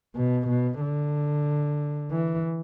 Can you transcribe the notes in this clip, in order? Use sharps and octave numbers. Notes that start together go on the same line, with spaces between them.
B2
B2
D3
E3